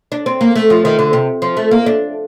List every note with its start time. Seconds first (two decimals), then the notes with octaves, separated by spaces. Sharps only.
0.12 D4
0.26 C4
0.41 A#3
0.55 A3
0.70 F3
0.85 D#3
0.99 D3
1.13 C3
1.42 F3
1.57 A3
1.71 A#3
1.86 D4